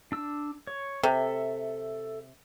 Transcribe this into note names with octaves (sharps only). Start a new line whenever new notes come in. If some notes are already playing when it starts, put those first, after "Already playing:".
D4 E6
C#5
C3 A4 E5